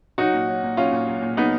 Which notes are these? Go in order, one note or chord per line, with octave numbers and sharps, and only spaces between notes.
F#3 D#4 F#4
A#2
F#3
A#2
F#3 C#4 F4
A#2
F#3
A#2
F#3 B3 D#4